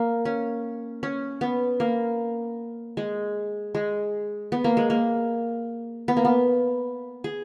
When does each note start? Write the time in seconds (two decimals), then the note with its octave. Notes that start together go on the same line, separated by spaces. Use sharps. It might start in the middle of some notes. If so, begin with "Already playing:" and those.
Already playing: A#3
0.25 C#4
1.03 C#4
1.41 B3
1.80 A#3
2.97 G#3
3.75 G#3
4.52 B3
4.64 A#3
4.77 G#3
4.90 A#3
6.08 B3
6.17 A#3
6.25 B3
7.24 G#4